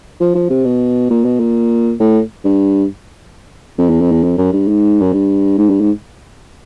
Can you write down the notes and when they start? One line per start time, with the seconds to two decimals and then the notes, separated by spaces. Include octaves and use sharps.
0.20 F3
0.35 F3
0.50 C3
0.65 B2
1.10 A#2
1.25 B2
1.40 A#2
2.00 A2
2.44 G2
3.78 F2
3.89 E2
4.01 F2
4.11 E2
4.23 F2
4.38 F#2
4.53 G2
4.68 G#2
5.01 F#2
5.13 G2
5.58 G#2
5.69 G2
5.80 G#2